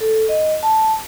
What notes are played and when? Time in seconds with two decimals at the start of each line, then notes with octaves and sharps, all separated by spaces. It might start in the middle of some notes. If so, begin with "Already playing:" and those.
0.01 A4
0.29 D#5
0.63 A5